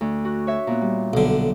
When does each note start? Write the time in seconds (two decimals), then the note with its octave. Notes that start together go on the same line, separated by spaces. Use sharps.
0.01 D2
0.25 F#4
0.47 C#5 E5
0.67 A#2 B3
0.81 G3
1.13 B1 D3